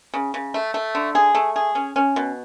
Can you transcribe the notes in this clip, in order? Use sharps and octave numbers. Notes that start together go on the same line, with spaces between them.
C#3
C#3
A3
A3
D3
G#4
A3
G#4
C#4
C#4
B2